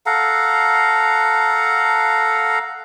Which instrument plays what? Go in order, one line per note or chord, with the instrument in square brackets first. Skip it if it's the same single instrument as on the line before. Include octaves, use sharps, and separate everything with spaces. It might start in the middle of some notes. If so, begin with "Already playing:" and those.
[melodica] A4 F5 F#5 A#5